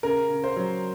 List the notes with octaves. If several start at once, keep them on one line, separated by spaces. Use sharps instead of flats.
C#3 A#4
C#3
C5
F#3